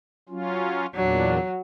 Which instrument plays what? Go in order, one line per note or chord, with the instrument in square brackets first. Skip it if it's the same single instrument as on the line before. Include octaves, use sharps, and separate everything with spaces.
[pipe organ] F#3 C#4 F4
[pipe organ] E2 A#2 D4 [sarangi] F#3